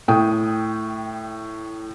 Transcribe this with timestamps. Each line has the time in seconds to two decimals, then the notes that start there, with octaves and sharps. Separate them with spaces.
0.08 A2 G5 D#6